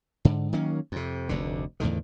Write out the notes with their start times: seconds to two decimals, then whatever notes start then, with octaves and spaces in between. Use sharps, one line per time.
0.25 G#2 D3
0.52 D#3 F#3 A#3 C#4
0.92 F2 C3
1.29 F1 D2 D3
1.80 E2 A2 D3 D#3